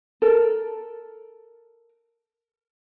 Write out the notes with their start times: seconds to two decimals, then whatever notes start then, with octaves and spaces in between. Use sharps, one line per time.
0.22 A4 A#4